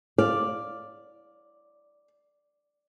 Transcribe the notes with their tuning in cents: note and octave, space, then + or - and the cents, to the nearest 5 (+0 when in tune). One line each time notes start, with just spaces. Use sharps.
D5 +0 F5 +0